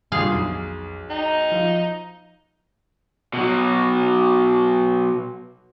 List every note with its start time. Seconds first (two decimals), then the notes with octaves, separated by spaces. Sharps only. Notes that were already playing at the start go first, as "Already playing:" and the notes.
0.12 C2 G2 A#2 G#4 F5
0.32 B1 F2
1.10 D#4 G5
1.52 F3 F4
3.33 B2 F#3